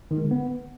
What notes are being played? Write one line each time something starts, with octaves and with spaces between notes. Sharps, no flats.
D#3
G#3
D3
B3